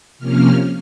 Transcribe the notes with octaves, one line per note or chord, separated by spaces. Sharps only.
C3 F3 A#3 C#4 F6